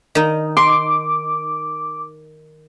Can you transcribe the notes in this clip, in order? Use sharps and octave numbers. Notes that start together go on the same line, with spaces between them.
D#3 D#4
C6 D6